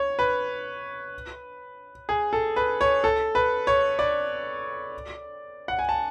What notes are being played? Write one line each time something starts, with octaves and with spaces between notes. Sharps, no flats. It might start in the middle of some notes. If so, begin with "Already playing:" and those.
Already playing: C#5
B4
G#4
A4
B4
C#5
A4
B4
C#5
D5
F#5
G#5
A5